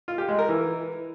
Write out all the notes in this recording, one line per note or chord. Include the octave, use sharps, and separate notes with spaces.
F4
G4
G#3
A#4
E3